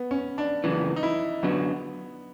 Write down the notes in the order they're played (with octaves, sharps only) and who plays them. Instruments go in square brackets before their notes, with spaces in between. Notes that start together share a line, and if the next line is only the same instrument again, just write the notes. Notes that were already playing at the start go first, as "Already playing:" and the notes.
Already playing: [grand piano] B3
C#4
D4
[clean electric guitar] F#2 C#3 E3
[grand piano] D#4
E4
[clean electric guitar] F#2 D3 F#3 [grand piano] B3